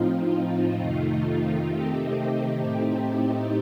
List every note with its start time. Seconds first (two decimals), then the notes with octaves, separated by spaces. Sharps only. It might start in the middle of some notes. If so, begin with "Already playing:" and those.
Already playing: A2 F3 C4 D#4 F4
0.76 F2 C3 D#3 A3 D#4
1.67 C3 D#3 A3 C4 D#4 G4
2.60 A2 A3 C4 D#4